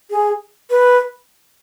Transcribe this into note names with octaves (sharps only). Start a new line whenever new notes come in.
G#4
B4